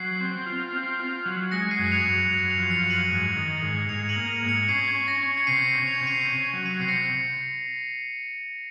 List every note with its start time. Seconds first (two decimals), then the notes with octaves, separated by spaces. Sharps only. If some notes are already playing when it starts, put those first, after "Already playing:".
Already playing: F#3 C7
0.21 C4
0.46 F4
0.73 C4
1.00 F4
1.26 F#3
1.51 G#3 A#6 C#7
1.71 C7 D#7
1.79 F#2
1.92 C#7 F7
2.05 F#2
2.30 F#2 C#7 F7
2.51 C#7 F7
2.58 F3
2.71 C#7 F7
2.83 F#2
2.90 D#7 F#7
3.10 G#2
3.36 D#3
3.63 G#2
3.89 G#2 C#7 F7
4.09 D#7 F#7
4.16 A#3
4.29 C#7 F7
4.42 G#2
4.49 C#7 F7
4.68 C#4 C7 D#7
4.95 C#4
5.07 A#6 C#7
5.21 C#4
5.37 C#7
5.47 C3 C7 D#7
5.75 C#4
5.87 C#7 F7
6.01 C3
6.07 C7 D#7
6.27 C#4 C7
6.53 F#3
6.66 D#7
6.74 C#7
6.79 C3 C7
6.88 A#6 C#7